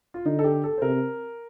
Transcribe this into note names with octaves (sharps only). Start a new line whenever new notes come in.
F4
D3 D#4
A4
G4
A4
C5
C3 A#4